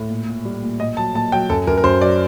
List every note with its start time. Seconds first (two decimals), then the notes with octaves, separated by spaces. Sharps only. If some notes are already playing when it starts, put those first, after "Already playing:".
Already playing: A2
0.10 A#2
0.29 A#2
0.45 G3
0.63 A#2
0.80 A#2 D#5
0.97 F#3 A5
1.14 A#2 A5
1.32 F#3 G5
1.50 F#2 A4
1.67 F#2 A#4
1.77 A#4
1.84 F#2 C5
2.01 F#3 D5